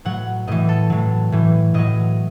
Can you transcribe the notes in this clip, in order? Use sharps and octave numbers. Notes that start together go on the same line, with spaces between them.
A2 F#3 F#5
A2 E3 D#5
A4
A2 F#3
A2 E3
A2 F#3 D#5